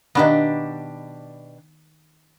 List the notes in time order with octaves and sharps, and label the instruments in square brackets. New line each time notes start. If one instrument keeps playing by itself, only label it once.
[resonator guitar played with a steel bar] B2 D4 G4 [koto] D#3 A#3 B3